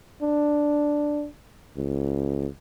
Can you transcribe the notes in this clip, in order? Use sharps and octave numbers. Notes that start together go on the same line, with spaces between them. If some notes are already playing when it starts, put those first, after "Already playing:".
D4
C#2